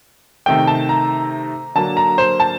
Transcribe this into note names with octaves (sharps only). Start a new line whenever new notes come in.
C3 D#3 A3 G5
A5
A#5
D3 F#3 A#3 A5
A#5
C5
A5